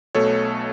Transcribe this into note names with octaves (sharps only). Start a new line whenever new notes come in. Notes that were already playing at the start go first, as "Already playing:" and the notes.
B1 B2 A3 A4 C#5